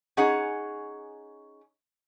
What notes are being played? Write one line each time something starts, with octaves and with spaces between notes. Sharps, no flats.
C#4 D#4 G#4 F#5